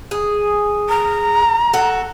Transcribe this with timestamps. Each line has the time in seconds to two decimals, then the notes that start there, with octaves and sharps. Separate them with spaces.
0.11 G#4
0.89 A#5
1.73 F#4 A4